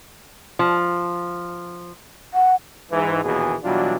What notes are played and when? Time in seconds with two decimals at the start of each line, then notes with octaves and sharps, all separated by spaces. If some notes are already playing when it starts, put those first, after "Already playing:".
0.59 F3
2.34 F#5
2.91 G#2 E3
3.24 A#1 D#2 B2 E3 G#4
3.64 B2 E3 F#3 G3 D4 F4